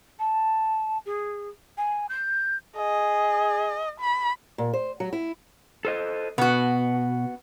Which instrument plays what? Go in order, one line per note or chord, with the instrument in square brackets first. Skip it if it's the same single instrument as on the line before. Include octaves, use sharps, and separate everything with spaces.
[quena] A5
G#4
G#5
G6
[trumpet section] G#4 [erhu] D#5
[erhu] B5
[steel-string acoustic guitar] A#2
C5
F#3
E4
[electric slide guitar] A4 C5 D#5
[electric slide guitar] B2 [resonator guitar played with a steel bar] B3 F#4